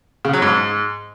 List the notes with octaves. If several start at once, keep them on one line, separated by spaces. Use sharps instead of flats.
C#3
F#3
G#2